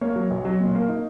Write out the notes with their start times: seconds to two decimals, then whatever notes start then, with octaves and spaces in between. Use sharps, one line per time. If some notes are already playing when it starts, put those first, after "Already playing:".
0.01 A#3 C#5
0.16 F#3
0.30 B1
0.45 F#3
0.60 A#2
0.75 A#3
0.89 D#4